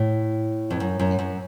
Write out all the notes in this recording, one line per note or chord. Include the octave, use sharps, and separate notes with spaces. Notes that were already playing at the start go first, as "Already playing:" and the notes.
Already playing: A2
F2
F#2
F#2
F#2